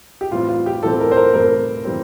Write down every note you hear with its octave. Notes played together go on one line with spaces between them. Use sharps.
G4
A2 E3 G3 C4 F4
F4
G4
A2 E3 G3 C4 A4
A#4
C5
A#4
A2 E3 G3 C4 A#4
E3 G3 C4